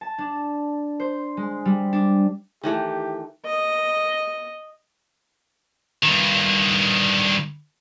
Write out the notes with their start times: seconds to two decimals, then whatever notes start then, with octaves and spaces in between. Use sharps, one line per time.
0.01 A5
0.18 D4
1.00 C5
1.37 G#3
1.65 G3
1.93 D4
2.64 D#3 E3 A3 G4
3.45 D#5
6.03 G2 D#3